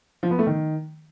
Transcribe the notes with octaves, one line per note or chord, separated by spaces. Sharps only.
F3
B3
A3
D#3